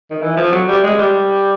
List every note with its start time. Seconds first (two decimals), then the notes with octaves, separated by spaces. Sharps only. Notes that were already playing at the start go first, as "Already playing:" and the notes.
0.11 D#3
0.22 E3
0.37 F3
0.52 F#3
0.68 G3
0.84 G#3
0.99 G3